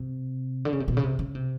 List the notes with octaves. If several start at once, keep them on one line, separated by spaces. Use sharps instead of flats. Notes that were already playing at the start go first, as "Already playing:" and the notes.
Already playing: C3
D3
C#3
C3
B2
C#3
C3
C#3
C3